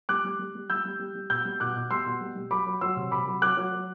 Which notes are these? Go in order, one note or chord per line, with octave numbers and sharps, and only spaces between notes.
G3 D6 F#6
G3
G3
G3
G3 E6 G6
G3
G3
G3
B2 E6 G6
G3
B2 D6 F#6
B2
G3 C6 E6
B2
G3
G3
F#3 B5 D6
F#3
F#3 C6 E6
C3
C3 B5 D6
F#3
F#3 D6 F#6
F#3
F#3